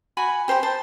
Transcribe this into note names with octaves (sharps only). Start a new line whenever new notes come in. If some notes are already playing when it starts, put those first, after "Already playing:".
F#4 G#5 B5
G4 C5 A#5 B5
C5 A5